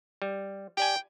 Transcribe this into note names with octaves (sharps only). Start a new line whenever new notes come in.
G3
G4 D5 G5 G#5